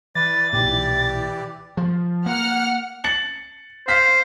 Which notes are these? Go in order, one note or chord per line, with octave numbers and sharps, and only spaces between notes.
E3 B4 D5 A6
B1 A#2 G4 D5
F3
A#3 F#5 F6 C#7
A6 C#7 F#7
C5 F5 F6 B6